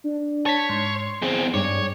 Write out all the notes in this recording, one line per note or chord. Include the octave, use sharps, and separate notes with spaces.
D4
C#5 A5 A6 B6
G#2 C6
E2 C4 G#4
G2 G3 C#5 D6